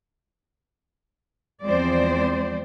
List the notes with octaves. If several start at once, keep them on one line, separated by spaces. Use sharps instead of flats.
E2 F3 G#3 C4 C5 D5